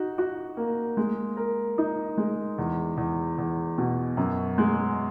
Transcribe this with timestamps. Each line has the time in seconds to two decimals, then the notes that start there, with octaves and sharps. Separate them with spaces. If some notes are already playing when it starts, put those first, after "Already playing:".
Already playing: D#4 F#4
0.18 F#4
0.57 A#3
0.97 G#3
1.37 A#4
1.78 D#4
2.18 G#3
2.58 E2
2.97 E2
3.38 E2
3.78 B2
4.17 F#2
4.58 G#3